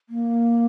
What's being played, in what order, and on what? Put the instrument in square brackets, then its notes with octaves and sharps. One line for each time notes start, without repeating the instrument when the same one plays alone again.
[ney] A#3